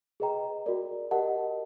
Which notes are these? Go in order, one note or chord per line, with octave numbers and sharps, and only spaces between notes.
G#4 B4 D#5 G5 A#5
F#4 A#4 D5
G4 A#4 D#5 F#5 A5